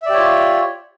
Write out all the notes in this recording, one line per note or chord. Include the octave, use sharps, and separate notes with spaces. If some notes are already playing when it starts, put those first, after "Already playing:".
F4 G4 C#5 D5 E5